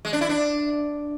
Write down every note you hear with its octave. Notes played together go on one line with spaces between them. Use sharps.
G#3
D4
E4
D4